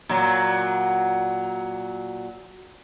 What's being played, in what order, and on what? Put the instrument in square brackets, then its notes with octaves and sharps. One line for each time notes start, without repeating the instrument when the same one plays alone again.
[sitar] A#2 F#3